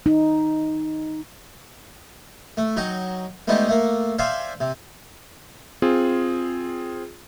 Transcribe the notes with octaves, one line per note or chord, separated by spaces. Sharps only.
D#4
A3
F#3 D#4 F#4 G5
G#3 A3 B3 D4 D#4 G4
A3 A#3
C5 D5 E5 F5 G5 G#5
C3
C4 F4 G#4